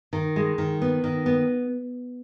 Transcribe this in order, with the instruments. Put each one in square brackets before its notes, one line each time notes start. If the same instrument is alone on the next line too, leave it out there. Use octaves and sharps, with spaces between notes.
[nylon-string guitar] D#3
G#3
D#3
B3
D#3
B3